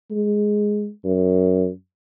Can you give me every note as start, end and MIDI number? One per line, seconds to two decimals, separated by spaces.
0.11 0.90 56
1.04 1.69 42